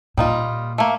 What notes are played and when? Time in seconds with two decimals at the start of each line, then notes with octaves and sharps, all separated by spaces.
0.17 A#2 G3 D#4 F4
0.78 A3 A#3